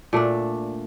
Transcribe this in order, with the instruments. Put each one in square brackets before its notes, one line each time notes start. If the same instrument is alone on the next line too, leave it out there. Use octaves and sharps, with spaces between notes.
[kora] A#2 A3 D4